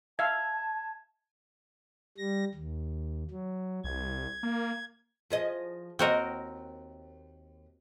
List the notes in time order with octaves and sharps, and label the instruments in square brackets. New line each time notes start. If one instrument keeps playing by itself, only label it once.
[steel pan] E5 F5 [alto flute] A5 [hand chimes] G#6
[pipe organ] G3 A#6
D#2
F#3
[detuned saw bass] C2 [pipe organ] G#6
[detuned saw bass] A#3
[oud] F3 G#4 D#5
[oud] D#2 D#5 [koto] C4 F#4 A#4